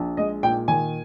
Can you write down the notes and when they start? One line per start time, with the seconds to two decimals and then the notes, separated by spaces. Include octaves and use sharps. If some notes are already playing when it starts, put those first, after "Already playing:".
Already playing: A#1
0.17 G#3 D#5
0.43 A#2 G5
0.68 D#3 G#5